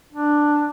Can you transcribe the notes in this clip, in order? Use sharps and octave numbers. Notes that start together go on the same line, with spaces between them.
D4